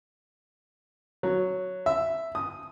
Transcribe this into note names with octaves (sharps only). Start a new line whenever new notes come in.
F#3
E5
D#6